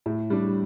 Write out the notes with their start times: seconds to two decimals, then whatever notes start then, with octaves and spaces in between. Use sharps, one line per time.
0.06 A2
0.30 G3 D4